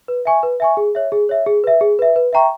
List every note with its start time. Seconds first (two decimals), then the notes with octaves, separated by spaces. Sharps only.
0.08 B4
0.25 E5 G#5 C#6
0.43 B4
0.60 E5 G#5 C#6
0.77 G#4
0.95 C#5 E5
1.12 G#4
1.29 C#5 E5
1.46 G#4
1.64 B4 E5
1.81 G#4
1.99 B4 E5
2.16 B4
2.33 E5 G5 A#5 C#6